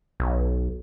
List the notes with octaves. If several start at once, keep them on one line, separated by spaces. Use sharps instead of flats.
B1